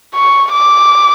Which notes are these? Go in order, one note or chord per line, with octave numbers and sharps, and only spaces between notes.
C#6
D6